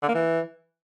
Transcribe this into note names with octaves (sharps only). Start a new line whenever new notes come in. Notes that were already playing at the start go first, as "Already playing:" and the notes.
D3
A#3
E3